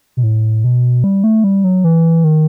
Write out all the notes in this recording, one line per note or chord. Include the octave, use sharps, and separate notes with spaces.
B2
A2
B2
G3
A3
G3
F#3
E3
D#3